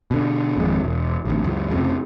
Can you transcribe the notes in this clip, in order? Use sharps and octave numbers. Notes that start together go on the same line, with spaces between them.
B2 D3
G#1 F2 G#3
E1
A1 D2
C#2 F#2
F1 A#1 F2 C#3